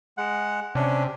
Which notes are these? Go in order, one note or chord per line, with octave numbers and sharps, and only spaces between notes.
G#3 F#5
C3 C#4 D4